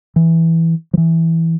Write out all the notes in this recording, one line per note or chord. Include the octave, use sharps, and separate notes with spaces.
E3
F3
E3